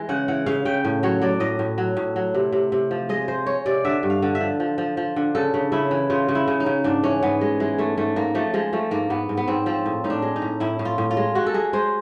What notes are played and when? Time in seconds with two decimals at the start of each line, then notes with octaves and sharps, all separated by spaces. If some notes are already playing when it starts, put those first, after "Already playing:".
Already playing: E3 G#3
0.09 C#3 F#5
0.28 E3 F#5
0.46 C#3 F5
0.65 C#3 G5
0.85 A2
1.03 F#3 C#5
1.22 F#3 D5
1.40 A2 D#5
1.59 A2
1.78 F#3
1.97 A2
2.16 F#3
2.35 C3
2.52 C3
2.72 C3
2.91 F3
3.09 G#3 D#5
3.28 G#3 C5
3.46 G#3 C#5
3.66 C3 D5
3.85 D3 E5
4.03 G2
4.10 F5
4.22 D3
4.35 E5
4.40 F3
4.60 F3
4.78 F3
4.97 F3
5.16 D3
5.35 C#3 A4
5.54 C#3
5.72 C#3 E4
5.91 E3
6.10 C#3 F4
6.29 C#3
6.35 E4
6.48 C#3
6.60 D#4
6.66 C#3
6.84 G#2 D4
7.03 E3 C#4
7.22 G#2 B3
7.41 G#3
7.60 E3 G#3
7.78 G#2 A3
7.97 G#2 A3
8.16 G#2 A#3
8.35 F3 A3
8.54 F3 G#3
8.73 F3 A3
8.91 G#2 A#3
9.10 G#2 B3
9.29 G#2
9.37 B3
9.48 G#2 C4
9.66 F3 C4
9.86 A2
10.04 A2 D#4
10.10 D4
10.22 G#3
10.36 D#4
10.42 A2
10.60 A2 E4
10.79 A2
10.85 F4
10.98 A2
11.11 F4
11.17 G#3
11.35 G#3 F#4
11.47 A4
11.54 G#3 G#4
11.73 G#3 C5